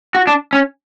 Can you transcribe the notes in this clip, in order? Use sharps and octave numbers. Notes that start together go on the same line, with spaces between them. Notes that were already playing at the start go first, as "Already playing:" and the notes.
F#4
D4
C#4